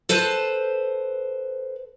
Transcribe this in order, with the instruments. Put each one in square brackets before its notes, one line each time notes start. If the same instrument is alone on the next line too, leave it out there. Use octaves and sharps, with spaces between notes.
[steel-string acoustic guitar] A4 B4 C5